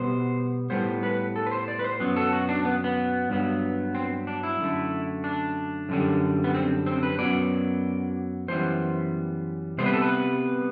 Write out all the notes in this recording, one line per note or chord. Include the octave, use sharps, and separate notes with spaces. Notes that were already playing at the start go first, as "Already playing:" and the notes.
Already playing: B2 G3 B3 C5
A2 G3 B3 C5
B4
A4
B4
C5
D5
B4
C5
F#2 F#3 B3
A4
F#4
D4
B3
B3
G2 F#3 B3
C4
D4
E4
F#2 D3 A3
D4
F#2 D3 G3
B3
C4
C4
B4
F#2 F#3 B3 D5
F#2 E3 G3 B3 C5
C3 G3 B3 C5
B4
A4
B4